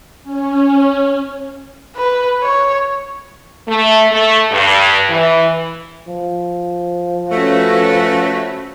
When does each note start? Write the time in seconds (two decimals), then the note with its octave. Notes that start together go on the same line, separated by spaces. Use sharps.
0.23 C#4
1.96 B4
2.43 C#5
3.68 A3
4.12 A3
4.52 G2
5.10 E3
6.08 F3
7.32 A3 C#4 F#4 B4